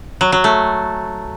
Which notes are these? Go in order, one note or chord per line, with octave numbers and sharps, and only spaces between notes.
F#3
F#3
A3